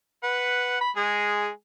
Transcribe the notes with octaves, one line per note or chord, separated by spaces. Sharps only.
B4 F#5
B5
G#3 G#4